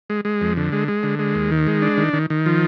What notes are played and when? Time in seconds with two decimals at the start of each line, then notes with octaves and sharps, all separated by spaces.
0.10 G#3
0.25 G#3
0.41 F2
0.57 D3
0.72 G#3
0.88 G#3
1.03 D3
1.19 G#3
1.35 D#2
1.51 D#3
1.67 G#3
1.82 D4
1.97 D#3
2.13 D#3
2.30 D#3
2.46 F3